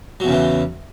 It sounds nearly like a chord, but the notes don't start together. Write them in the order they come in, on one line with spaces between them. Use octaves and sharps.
F#3 E2 C#3 E3